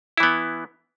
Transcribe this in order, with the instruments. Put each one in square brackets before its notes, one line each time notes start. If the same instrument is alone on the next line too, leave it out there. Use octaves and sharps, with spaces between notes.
[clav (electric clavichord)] E4
E3
B3